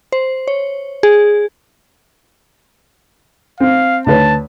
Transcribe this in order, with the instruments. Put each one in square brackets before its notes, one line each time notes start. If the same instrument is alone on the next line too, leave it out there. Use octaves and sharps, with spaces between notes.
[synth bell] C5
C#5
G#4
[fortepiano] C4 [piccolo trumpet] F5
[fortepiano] D2 B4 C#5 [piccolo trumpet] A5